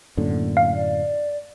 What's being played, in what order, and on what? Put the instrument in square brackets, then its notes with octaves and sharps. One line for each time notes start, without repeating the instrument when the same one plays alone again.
[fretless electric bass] F#2 A2 D3 [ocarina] A#3
[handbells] F5
[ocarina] D5